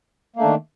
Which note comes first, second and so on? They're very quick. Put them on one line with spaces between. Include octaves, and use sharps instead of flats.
A#3 A3 D4 D#3